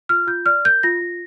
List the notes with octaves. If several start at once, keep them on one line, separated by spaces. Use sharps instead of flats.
F4 F6
F4 G6
D5 F6
A#4 G6
F4 A#6
F4